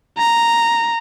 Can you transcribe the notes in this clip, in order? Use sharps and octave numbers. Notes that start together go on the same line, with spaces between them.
A#5